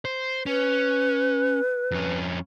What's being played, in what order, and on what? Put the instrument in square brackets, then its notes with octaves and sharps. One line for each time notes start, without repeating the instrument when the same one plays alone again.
[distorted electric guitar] C5
[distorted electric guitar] C#4 [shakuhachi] B4
[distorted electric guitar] F2 C#4